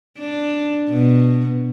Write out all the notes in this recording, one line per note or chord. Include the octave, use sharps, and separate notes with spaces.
D4
B2